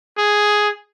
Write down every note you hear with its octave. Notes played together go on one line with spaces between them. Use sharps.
G#4